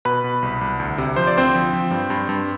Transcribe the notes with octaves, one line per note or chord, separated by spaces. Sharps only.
B2 B4 B5
B2
C2
C2
D2
C3
F3 C5
D5
D2 C4 C5
F3
F3
G2
G2
G2